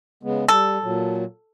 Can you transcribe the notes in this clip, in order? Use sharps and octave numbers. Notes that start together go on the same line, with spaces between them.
C#3 G#3 B3
G3 A4
A#2 F#3